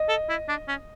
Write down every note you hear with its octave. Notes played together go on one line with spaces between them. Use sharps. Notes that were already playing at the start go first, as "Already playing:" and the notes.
Already playing: D#5
A4
E4
D4
C#4